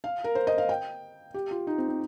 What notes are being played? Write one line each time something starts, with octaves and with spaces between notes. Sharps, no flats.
F5
A#4
C5
D#5
F5
G5
G4
F4
D#4
C4
C4